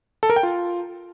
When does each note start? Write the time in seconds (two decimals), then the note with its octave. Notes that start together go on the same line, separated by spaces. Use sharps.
0.23 A4
0.30 A#4
0.36 G5
0.43 F4